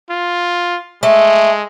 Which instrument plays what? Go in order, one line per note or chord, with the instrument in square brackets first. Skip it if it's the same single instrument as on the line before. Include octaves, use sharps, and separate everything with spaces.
[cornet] F4
[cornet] G#3 [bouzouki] A3